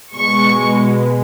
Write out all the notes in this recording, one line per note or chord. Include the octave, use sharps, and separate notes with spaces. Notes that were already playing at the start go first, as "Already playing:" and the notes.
B2 G#3 C#6